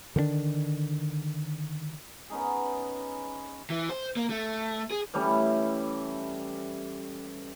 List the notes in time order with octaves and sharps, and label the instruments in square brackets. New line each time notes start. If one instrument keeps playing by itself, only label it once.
[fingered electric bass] D3 D#3 C4 D4
[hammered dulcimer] B3 C#4 D#4 G#4
[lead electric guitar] E3
C5
A#3
A3
G#4
[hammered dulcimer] E3 G3 A3 C#4